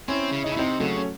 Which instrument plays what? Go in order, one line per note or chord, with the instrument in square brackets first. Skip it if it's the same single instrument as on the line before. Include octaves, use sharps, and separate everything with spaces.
[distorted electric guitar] C4 [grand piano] C#4 E4
[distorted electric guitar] C#3
[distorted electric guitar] C#3 [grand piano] D#4
[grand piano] E4
[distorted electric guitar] C3 [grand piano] C4 D#4
[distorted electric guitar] C#3 [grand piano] F#3 A3
[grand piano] C#4